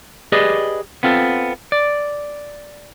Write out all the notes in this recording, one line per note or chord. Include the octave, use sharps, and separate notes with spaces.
G4 G#4 B4 D5 D#5
B3 C4 F4 A4
D5